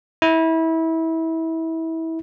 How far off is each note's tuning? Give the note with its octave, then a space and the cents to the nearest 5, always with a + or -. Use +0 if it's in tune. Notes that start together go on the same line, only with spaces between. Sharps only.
E4 -25